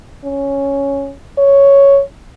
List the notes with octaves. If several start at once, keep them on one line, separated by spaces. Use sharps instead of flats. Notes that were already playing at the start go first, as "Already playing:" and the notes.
C#4
C#5